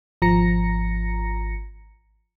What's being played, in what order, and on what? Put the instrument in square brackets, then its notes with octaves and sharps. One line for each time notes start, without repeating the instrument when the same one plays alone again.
[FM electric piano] G#1 F3 A#5 A#6 C#7